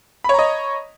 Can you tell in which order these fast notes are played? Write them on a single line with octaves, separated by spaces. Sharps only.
B5 C#5 A#5 D#5